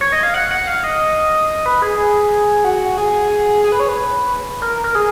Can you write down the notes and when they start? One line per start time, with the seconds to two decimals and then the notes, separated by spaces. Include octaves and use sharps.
0.01 C#5
0.12 D#5
0.23 F5
0.34 F#5
0.51 F#5
0.67 F5
0.84 D#5
1.66 B4
1.82 G#4
2.65 F#4
2.98 G#4
3.64 G#4
3.72 B4
3.80 C#5
3.89 B4
4.62 A#4
4.84 A#4
4.95 G#4